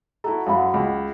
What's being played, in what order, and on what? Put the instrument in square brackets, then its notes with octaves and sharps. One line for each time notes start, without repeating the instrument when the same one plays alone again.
[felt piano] E4 F#4 A4 [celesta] A#5
[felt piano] F#2 F#3 [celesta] F5 F#5 B5
[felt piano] C#2